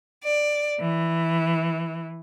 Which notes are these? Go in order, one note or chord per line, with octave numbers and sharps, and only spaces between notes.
D5
E3